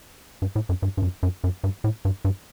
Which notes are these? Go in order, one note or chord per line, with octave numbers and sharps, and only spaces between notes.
G2
A2
F#2
G2
G2
F#2
F#2
F#2
G2
A2
G2
G2